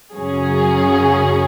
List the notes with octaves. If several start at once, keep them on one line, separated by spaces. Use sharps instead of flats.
F#2 C#3 F#3 C#4 G#4